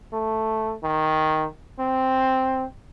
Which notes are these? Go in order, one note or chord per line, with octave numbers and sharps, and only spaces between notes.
A3
D#3
C4